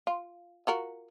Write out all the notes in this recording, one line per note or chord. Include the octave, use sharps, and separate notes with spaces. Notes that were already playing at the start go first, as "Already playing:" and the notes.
F4
F4 F#4 A#4